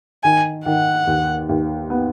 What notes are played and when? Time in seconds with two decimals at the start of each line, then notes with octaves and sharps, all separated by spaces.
0.23 D#3 G#5
0.66 D#3 F#5
1.07 D#2
1.49 D#2
1.90 B3